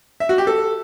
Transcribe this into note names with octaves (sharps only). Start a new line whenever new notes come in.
E5
F#4
G4
A4